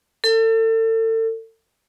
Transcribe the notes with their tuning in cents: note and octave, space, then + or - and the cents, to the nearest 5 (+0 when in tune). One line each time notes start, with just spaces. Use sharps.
A4 +35